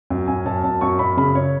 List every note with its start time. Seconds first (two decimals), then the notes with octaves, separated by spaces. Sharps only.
0.10 F#2
0.28 F#2 G#5
0.46 F#2 A5
0.64 F#2 A5
0.81 F#2 C#6
0.99 F#2 B5
1.17 C#3 B5
1.35 C#3 C#5